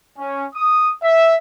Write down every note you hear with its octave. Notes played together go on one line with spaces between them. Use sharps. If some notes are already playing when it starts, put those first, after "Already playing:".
C#4
D#6
E5